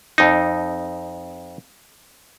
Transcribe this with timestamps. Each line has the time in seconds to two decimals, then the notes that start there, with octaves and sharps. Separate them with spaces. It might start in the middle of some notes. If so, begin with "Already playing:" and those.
0.18 F2 D#4